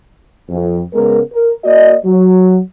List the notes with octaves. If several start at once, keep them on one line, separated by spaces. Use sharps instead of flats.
F2
C#3 G#3 B3 A#4
A#4
A#3 F#4 D5 D#5
F#3